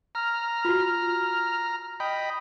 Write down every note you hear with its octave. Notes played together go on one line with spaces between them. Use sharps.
A#5 F6
F4 F#4
D#5 G5 B5